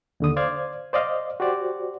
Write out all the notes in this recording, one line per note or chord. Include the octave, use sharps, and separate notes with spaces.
D#2 D3 D#6
C5 D5 F5 G#6
C5 D5 D#5 F5
F#4 G4 C5 D5